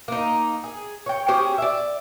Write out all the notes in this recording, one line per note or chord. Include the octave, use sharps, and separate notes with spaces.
A#3 D#4
G#4
C#5 G5
C#4 G4 G#4 C5
D5 E5